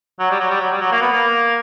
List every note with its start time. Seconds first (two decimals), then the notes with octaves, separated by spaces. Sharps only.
0.19 F#3
0.30 G3
0.40 F#3
0.50 G3
0.61 F#3
0.71 G3
0.81 F#3
0.92 A#3
1.02 B3
1.12 A#3